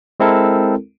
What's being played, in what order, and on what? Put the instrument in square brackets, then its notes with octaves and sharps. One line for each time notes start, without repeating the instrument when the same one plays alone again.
[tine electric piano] G#3 C4 E4 A4 A#4